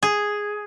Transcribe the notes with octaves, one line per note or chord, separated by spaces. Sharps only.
G#4